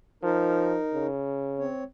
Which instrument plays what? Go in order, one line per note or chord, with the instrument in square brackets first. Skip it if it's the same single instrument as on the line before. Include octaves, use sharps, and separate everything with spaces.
[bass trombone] F3 [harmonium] D#4 A#4
[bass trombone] C#3
[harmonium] C4 C#5